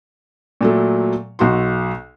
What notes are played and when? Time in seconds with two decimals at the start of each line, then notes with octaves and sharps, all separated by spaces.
0.61 A#2 F#3 A3
1.39 B1 F#4 C6